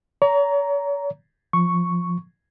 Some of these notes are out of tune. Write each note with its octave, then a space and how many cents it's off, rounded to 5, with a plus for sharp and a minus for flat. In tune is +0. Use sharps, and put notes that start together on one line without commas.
C#5 +40 A#5 +0
F3 +5 C#6 +0